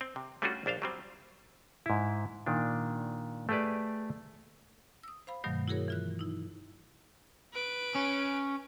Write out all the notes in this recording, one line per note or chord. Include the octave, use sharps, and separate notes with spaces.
C4
C3
G3 A3 C#4 D4 F4 F#4
A#1 D4 C5 F5
F#3 G3 C4
G#2 E4
A#2 D#3 D4
A3 G4 G#4 B4 D5
D#6 E6
C5 F5 B5
G2 B2 D#3 F#3 A3
E4 F#4 G#4 A#4 C#5
E3 F4 F#6
D#4 E4
B4 D7
C#4